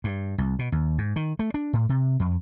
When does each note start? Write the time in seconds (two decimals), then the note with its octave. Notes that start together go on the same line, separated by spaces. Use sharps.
0.04 G2
0.38 C2
0.59 B2
0.72 D#2
0.98 G#2
1.16 D#3
1.39 A3
1.54 D4
1.73 A2
1.89 C3
2.20 F2